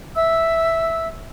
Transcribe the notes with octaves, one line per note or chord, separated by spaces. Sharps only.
E5 E6